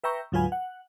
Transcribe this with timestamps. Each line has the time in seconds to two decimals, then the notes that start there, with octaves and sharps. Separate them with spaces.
0.04 B4 E5 G5 A#5 C#6
0.32 D2 G#2 F#3 F4 B4 G#5
0.52 F#5